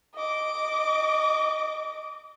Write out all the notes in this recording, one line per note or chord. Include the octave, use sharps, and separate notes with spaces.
D#5 D6